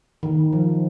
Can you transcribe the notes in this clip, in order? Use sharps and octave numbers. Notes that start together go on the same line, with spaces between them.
D#3
F3